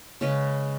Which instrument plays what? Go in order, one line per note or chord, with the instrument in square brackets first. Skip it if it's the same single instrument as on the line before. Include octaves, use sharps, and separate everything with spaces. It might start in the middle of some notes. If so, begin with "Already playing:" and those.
[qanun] C#3 G#3 C#4 B4